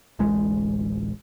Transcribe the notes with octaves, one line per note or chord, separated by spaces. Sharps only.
D1 A1 G#3